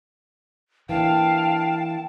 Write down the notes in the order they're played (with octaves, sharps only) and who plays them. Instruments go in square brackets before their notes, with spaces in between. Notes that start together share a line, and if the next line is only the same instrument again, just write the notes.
[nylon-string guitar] E3 A#3 D4 [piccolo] F5 [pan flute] G5 [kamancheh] A5